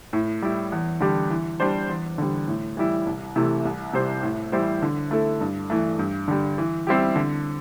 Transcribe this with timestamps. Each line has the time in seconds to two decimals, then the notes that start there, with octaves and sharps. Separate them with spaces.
0.13 A2
0.42 G3 E4
0.72 E2
1.00 D3 G3 D4 G4
1.30 E3
1.60 G3 D4 C5
1.89 E2
2.18 D3 G3
2.48 A2
2.77 E3 G3 E4
3.06 C2
3.36 C3 E3 A3 E4
3.65 C2
3.93 C3 G3 E4 C5
4.23 A2
4.52 E3 G3 E4 C5
4.82 D3
5.11 A3 E4 A4
5.41 G2
5.70 E3 A3
5.99 G2
6.28 D3 G3
6.58 E3
6.87 G3 C4 E4 G4
7.15 D3